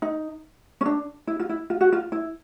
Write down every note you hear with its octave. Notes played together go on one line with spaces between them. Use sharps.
D#4
C#4
D4
E4
F4
E4
F4
F#4
F4
E4